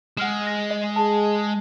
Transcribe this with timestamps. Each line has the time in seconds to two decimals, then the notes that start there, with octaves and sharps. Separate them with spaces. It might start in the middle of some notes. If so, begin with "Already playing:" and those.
0.17 G#3 F#5 F6 E7
0.47 A#6
0.71 D#5
0.96 G#4 A5